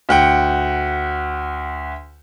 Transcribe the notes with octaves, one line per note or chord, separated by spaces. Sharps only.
D2 F#5 G5